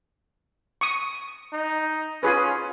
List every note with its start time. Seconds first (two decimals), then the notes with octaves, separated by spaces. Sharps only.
0.81 C#6 D#6
1.53 D#4
2.23 C#4 F4 G#4 B4